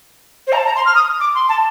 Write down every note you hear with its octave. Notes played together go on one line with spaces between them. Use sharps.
C5
A#5
A5
A#5
C6
F6
D#6
D6
C6
A5